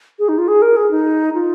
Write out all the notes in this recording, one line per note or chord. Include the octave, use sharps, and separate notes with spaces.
G#4
D#4
F4
G#4
A#4
G#4
D#4
F4